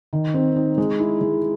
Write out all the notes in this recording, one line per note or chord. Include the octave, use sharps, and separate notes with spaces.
D#3
C4
D#4
G#3
E4
G#3